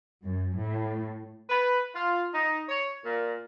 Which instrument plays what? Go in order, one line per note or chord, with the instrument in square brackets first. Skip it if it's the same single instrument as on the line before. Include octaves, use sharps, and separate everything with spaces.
[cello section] F#2
A2
[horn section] B4
F4
D#4
C#5
A#2